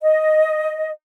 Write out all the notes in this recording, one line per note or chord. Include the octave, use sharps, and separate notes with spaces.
D#5